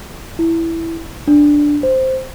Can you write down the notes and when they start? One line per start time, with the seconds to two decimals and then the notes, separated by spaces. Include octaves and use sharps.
0.39 E4
1.28 D4
1.83 C5